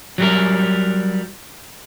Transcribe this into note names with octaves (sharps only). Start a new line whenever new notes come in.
F#3 G3 A#4